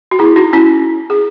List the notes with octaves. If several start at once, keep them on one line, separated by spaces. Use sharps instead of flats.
F#4
E4 G#4
D#4 F#4
C#4 E4
G#4